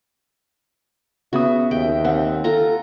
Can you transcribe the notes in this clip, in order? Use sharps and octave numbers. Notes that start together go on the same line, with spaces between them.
C#3 B3 F#4 E5 D#6
D#2 E5 G5
C4 F#5
F4 A4 A#5